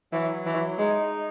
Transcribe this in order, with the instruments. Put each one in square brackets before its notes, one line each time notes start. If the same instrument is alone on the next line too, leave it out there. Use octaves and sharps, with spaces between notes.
[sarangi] E3 [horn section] F#3
[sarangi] E3
[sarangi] G#3 [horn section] D#4